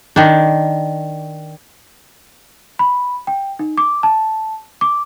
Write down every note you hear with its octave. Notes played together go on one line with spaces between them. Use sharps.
D#3 D4
B5
G5
D#4
D6
A5
D6